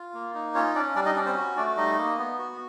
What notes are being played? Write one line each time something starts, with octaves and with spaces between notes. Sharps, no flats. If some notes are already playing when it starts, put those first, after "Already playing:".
Already playing: F4
A#3
D#4
C#4 F4 C#5
C#4 D4 D5
G3 D4 D5
D#4 D#5
C#4 D4 D5
C4 C5
F#4
A3 D4 D5
G3 D#4 D#5
A#3
B3
F#4